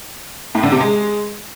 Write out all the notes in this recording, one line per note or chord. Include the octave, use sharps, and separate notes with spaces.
A2
D3
C3
G#3